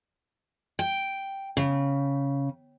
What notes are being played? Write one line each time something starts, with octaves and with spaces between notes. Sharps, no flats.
G5
C#3